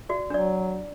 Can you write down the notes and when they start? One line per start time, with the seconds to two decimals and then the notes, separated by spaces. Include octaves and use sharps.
0.09 F#4 D5
0.30 F#3 D4 D5